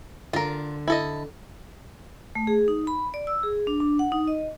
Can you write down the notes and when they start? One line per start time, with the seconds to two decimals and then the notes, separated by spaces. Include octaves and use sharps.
0.33 D3 F4 A#4
0.88 E4 A4 D#5
2.35 A3
2.47 G#4
2.68 D#4
2.87 B5
3.14 D5
3.27 E6
3.43 G#4
3.67 D4
3.80 D4
3.99 F#5
4.12 D#4
4.28 D#5